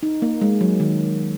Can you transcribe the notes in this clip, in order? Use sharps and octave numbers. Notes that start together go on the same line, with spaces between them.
D#4
A#3
G#3
F#3
D#3